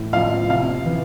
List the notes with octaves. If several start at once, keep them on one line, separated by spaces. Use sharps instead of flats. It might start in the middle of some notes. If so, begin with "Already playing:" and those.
Already playing: A2 E3
F3 F5
C3 F5
E3